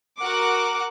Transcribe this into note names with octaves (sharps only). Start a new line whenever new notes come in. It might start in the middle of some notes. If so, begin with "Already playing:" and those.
F#4 A#4 F#5 D6